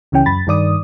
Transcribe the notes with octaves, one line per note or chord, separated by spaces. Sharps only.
C#2 C#3 E3 C#4 G5
F#2 B5 A6
G2 D#3 D5 D#6